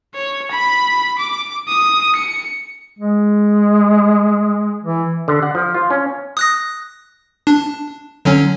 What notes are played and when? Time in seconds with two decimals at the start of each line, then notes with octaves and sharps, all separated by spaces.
0.15 C#5
0.51 B5
1.19 D6
1.68 D#6
2.16 C#7
2.99 G#3
4.84 E3
5.28 D3
5.43 F#5
5.55 F3
5.74 F4
5.90 C#4
6.37 D#6 F#6 A#6
7.47 D4
8.25 D3 F#3 C#4